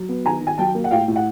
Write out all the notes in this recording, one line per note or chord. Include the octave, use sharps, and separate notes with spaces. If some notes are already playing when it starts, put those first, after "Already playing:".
Already playing: F#3
B3
D#3 G#5 A#5
D#3
G#5
F#3 G5 A5
A#3
F#5
A2 F5 G5
A2
F#5